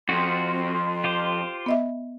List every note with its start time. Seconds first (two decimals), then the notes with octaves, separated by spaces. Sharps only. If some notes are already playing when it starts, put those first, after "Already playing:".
0.09 F2 C4 F#4 C6
1.04 F4 G4 C5
1.66 B3 D#5 E5